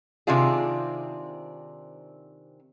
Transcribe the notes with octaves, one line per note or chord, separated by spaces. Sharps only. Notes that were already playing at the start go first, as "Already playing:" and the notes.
C3 D#3 C4 D4 F4 G#4